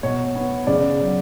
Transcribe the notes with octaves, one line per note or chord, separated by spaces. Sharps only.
B2 C#5
B3
C#3 D5
F#3